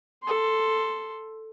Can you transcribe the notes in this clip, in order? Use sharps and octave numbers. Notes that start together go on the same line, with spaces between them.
A4 C6